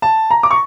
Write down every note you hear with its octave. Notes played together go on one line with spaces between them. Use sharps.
A5
A#5
D6
C#6